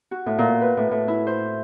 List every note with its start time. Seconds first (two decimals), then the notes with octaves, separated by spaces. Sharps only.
0.11 F#4
0.26 A2
0.38 A#2
0.61 B4
0.77 A2
0.91 A2
1.08 E4
1.27 C5